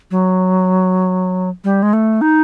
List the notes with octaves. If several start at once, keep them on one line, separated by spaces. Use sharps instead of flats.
F#3
G3
G#3
A3
D#4